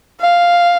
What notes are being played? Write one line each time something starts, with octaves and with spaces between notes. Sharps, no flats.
F5